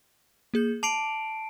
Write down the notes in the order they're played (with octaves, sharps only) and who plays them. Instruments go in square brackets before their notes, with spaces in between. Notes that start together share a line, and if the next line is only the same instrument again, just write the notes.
[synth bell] A#3 G#4 G6
[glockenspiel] A5 C7 D7 [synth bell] D6 F7 F#7